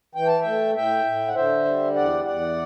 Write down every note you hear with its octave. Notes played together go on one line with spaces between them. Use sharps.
E3 G5
A5
E5 G5
A3
A2 E5 G5
A2
F#5
D3 C5 E5
G3
E2 D5 F#5
E2 D5 F#5